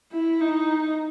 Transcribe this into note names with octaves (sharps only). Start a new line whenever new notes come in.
E4
D#4